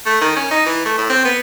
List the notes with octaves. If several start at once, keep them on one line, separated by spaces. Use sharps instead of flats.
A3
D#3
C#4
D#4
E3
A3
A2
C4
B3